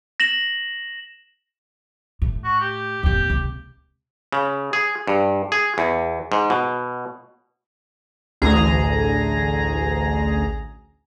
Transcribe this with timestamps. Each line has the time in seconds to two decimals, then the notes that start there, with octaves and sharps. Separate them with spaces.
0.20 A#6 E7 F#7
2.22 A2
2.44 F#4
2.60 G4
3.03 E2 A2 G4
3.30 C#2 C3
4.32 C#3
4.73 G#4
5.07 G2
5.52 G#4
5.78 E2
6.32 G#2
6.50 B2
8.42 A1 D2 G#4 A#5